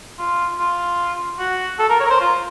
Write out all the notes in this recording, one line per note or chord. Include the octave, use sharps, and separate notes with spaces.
F4
F4
F#4
A4
A#4
C#5
A#4
C5
F4